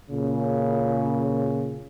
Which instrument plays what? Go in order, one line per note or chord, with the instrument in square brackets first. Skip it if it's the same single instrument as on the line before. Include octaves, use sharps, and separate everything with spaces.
[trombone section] A#2 C#3